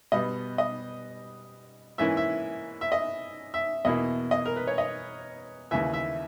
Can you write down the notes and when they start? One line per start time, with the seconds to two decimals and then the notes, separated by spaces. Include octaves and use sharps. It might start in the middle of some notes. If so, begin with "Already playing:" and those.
0.12 B2 G3 B3 D#5
0.58 D#5
1.98 G#2 E3 A#3 C#4 E4 E5
2.17 E5
2.81 E5
2.92 D#5
3.54 E5
3.85 E2 B2 A#3 E4 D#5
4.31 D#5
4.46 A#4
4.56 B4
4.67 C#5
4.78 D#5
5.71 D#2 C#3 E3 E5
5.93 E5